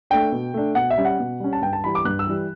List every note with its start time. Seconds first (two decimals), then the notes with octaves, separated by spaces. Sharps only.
0.10 A3 D4 G5
0.32 B2
0.54 A3 D4
0.75 B2 F#5
0.90 E5
0.97 G3 C#4
1.05 F#5
1.19 B2
1.40 G3 C#4
1.53 A5
1.62 G2 G5
1.73 A5
1.84 E3 G3 B5
1.95 D6
2.05 G2 F#6
2.19 E6
2.27 E3 G3